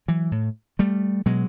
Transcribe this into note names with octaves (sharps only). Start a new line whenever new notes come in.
E3 F#3
A2
G3 A3
B2 F#3 G#3